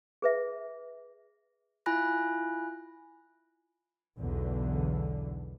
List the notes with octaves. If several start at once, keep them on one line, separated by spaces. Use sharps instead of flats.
G#4 B4 E5
E4 F4 G#5 B5 F#6 A#6
B1 E2 D3